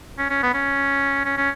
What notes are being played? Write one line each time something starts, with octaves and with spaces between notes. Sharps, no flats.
C#4
C#4
B3
C#4
C#4
C#4